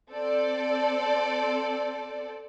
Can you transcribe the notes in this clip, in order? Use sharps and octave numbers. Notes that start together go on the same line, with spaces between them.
C4 A4 D5